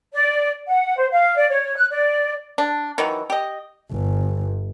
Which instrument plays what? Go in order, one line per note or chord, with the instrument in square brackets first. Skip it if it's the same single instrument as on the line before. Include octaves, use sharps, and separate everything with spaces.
[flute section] D5
F#5
C5
F5
D5
C#5
F#6
D5
[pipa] D4
D#3 E3 F#3
G4 D#5
[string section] G1